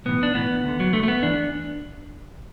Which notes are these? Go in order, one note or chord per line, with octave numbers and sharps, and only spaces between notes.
B1 A2 E3 B3
D4
B1 A2 E3 B3
D2 D3
F#3
D2 D3 A3
A3
B3
E2 E3 D4